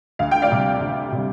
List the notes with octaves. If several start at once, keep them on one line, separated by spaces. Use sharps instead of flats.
D2 F5
G5
D5 F5
C3 G3
D2
C3 G3